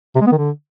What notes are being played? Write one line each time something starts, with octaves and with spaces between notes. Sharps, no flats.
C3
G#3
B3
D#3
D3